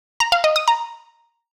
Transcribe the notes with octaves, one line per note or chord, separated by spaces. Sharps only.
A#5
F5
D#5
D#6
A#5